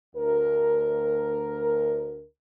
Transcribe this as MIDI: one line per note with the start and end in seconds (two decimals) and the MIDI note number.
0.15 2.24 38
0.15 2.24 70